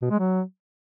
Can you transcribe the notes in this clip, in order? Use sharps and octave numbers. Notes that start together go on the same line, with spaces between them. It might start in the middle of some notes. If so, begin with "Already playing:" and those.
B2
G#3
F#3